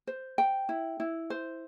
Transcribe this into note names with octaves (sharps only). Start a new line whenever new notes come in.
C5
G5
E4
E4
C5